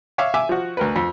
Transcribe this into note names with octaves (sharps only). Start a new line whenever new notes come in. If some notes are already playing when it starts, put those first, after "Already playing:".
C#5 E5 F5 D6
E5 G#5 D6
F3 F#4
D2 A#4 B4
F2